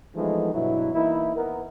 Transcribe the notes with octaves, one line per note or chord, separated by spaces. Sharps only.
E3 F3 G#3 A3 B3 D#4
G2 B2 F#3 E4
E3 A#3 D#4 E4
B3 A#4